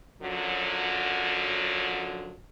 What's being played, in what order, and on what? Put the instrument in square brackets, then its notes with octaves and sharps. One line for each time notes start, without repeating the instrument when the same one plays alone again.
[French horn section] F#2 D3 F3 F#3